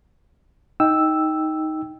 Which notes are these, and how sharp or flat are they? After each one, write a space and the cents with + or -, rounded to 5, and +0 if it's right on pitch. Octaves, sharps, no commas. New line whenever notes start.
D#4 +10 G5 +0 E6 +0